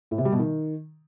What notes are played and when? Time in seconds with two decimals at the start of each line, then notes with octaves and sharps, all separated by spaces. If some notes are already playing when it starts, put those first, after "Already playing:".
0.11 A2
0.18 C3
0.25 G3
0.32 B2
0.39 D#3